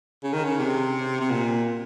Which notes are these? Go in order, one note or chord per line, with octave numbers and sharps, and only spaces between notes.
C#3
D#3
C#3
C3
C3
A#2